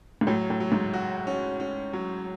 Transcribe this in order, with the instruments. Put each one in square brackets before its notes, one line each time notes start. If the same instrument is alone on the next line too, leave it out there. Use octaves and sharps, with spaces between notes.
[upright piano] G#2
[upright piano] A2 [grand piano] F#3
[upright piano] A2
[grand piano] F#3
[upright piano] G#2
[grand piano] F#4
C#4
C#4
F#3